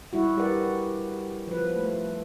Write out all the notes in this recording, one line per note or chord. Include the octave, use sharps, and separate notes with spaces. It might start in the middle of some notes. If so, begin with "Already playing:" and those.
G3 E4 F#4
G3 G4 A#4 B4 D5 F#5
F3 B4
A3